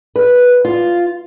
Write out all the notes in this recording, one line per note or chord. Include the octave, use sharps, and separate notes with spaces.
B4
F4